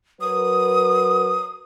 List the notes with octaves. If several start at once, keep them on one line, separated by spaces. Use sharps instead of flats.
F#3 A#4 B4 D#6